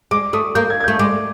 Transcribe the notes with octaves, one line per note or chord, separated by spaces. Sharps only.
G#3 D6
A3 D#6
A#3 G6
G#6
G#6
G6
A3
G#3 D6